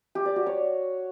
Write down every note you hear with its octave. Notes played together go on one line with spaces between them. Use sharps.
G4
D5
F#4
C#5